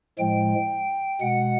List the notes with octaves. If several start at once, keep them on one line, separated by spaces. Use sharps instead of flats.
A2 F3 G#3 G5
B2 G#3 F#5